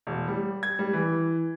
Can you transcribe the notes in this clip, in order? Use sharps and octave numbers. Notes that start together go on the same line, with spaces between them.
E1
G3
G#6
G3
E3